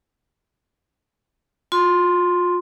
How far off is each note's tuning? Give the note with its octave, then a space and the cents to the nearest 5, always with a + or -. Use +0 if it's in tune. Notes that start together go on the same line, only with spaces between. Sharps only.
F4 +35 C6 +0